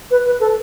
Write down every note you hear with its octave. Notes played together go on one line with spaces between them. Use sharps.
B4
B4
A4